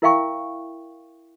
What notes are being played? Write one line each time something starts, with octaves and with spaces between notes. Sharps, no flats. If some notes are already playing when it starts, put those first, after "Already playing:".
E4 A#4 E5 F5 G5 C#6